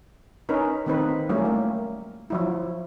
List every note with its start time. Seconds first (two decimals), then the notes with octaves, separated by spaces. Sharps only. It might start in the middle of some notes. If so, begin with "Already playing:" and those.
0.49 C#4 D#4 A#4 B4
0.86 D#3 A#3 C4 D#4 B4
1.29 F#3 G3 A3 A#3 C#4 E4
1.45 A#3
2.30 F3 F#3 E4